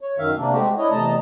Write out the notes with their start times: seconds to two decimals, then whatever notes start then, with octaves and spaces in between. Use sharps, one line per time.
0.01 C#5
0.18 F#2 D#3 E5 F5
0.37 C3 A#3 D4
0.52 G#3 A3 C4 F#4 G4
0.77 D4 E4 C#5 D#5
0.91 E2 C3 A3 D#5 A5 A#5